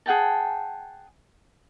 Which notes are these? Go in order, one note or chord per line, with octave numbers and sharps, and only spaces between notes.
G#4 F#5 G5 A5